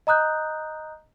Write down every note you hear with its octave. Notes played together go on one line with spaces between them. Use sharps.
D#5 A#5 D#6 F#6 G6